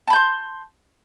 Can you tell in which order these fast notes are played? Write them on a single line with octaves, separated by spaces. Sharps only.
A5 B5 G6 C6